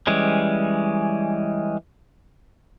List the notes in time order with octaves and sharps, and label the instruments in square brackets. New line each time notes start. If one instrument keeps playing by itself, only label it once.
[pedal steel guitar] E3 G3 G#3 C#4